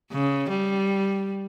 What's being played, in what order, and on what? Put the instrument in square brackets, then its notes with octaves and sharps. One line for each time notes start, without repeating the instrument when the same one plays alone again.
[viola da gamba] C#3
G3